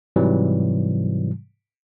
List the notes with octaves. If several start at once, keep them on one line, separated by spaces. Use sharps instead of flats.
G#2 C3 E3 F#3 G3